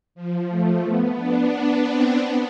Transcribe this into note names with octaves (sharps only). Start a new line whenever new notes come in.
F3
A3
B3
D4
C4
B3